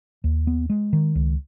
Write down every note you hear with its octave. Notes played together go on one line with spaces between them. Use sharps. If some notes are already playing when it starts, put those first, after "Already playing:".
D#2
B3
G#3
D#3
C#2